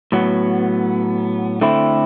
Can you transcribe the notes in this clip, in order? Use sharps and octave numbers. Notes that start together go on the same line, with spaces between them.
A2 F#3 B3
D3 A3 C4 E4